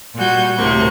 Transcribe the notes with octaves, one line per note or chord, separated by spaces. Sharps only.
A#2 G3 F#4 G#5 G6
D2 A2 C3 A#3 C#6